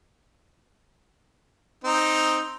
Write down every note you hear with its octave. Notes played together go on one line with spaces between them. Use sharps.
C4 D#4